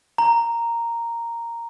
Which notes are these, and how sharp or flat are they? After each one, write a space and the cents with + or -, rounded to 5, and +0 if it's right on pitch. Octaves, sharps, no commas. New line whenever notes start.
A#5 -5